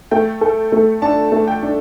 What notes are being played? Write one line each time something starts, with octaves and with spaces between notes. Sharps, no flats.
A3 G5
A4
A3
D4 A5
A3
G5
D4